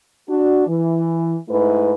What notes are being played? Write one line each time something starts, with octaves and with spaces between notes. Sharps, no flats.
D4 F#4
E3
G#2 A3 E4 B4